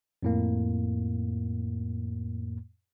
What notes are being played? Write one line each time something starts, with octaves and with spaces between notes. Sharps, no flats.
F2 A2 A#3